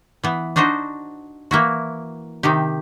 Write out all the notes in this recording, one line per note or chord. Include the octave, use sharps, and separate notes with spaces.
E3 B3
D4 D#4 F#4 C5 D#5
E3 A#3 E4 F#4
C3 D#3 D#4 G4